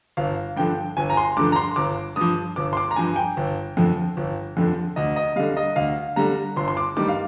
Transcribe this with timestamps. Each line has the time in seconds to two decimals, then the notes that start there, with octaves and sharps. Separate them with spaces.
0.17 G1 F5
0.56 G2 D3 F3 G5
0.97 G1 G#5
1.10 A#5
1.17 C6
1.37 G2 D3 F3 D6
1.52 A#5
1.56 C6
1.76 G1 D6
2.16 G2 F3 D#6
2.56 G1 D6
2.73 C6
2.77 D6
2.91 A#5
2.96 G2 F3 G#5
3.16 G5
3.37 G1
3.77 F2 D3 F3
4.17 G1
4.57 F2 D3 F3
4.96 D2 D#5
5.16 D#5
5.36 D3 G3 F5
5.57 D#5
5.76 D2 F5
6.16 D3 G3 A#5
6.56 G1 C6
6.68 C6
6.77 D6
6.97 G2 D#3 G3 D6
7.08 F5